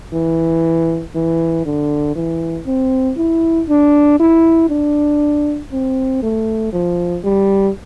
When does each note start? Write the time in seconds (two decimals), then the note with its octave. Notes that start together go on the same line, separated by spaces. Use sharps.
0.13 E3
1.15 E3
1.66 D3
2.15 E3
2.66 C4
3.17 E4
3.69 D4
4.20 E4
4.69 D4
5.72 C4
6.22 A3
6.73 F3
7.24 G3